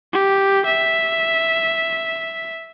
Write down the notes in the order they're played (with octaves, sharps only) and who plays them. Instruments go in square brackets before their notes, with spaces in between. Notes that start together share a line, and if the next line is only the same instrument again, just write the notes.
[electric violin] G4
E5